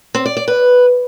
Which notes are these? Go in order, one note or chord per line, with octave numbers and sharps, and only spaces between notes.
C4
D5
D5
B4